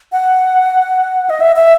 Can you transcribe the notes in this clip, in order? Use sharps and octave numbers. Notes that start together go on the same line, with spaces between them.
F#5
D#5
E5
E5